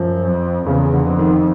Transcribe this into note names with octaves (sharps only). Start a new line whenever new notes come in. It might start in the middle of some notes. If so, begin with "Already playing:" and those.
Already playing: F#2 F3
F2
E2 C#3
D3
F2
D#3